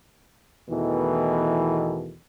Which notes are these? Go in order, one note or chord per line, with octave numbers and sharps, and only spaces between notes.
E2 B2 D#3 E3 A3